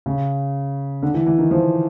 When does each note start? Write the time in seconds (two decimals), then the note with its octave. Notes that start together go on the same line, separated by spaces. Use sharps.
0.06 C#3
1.03 D3
1.14 E3
1.26 E3
1.38 D#3
1.51 F3